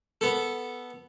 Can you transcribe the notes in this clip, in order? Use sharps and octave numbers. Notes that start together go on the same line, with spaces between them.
B3 A4